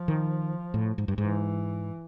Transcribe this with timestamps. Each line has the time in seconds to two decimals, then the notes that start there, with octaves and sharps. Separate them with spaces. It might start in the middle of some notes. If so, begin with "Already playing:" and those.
Already playing: F3
0.08 D#3
0.74 A2
0.98 G#2
1.08 G2
1.18 G#2 E3